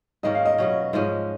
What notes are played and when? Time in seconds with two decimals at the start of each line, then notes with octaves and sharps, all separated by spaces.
0.23 G#2 D#3 A#3 C#4 D#5
0.35 F5
0.45 D#5
0.58 B2 F#3 C#4
0.93 G#2 F3 G#3 C#4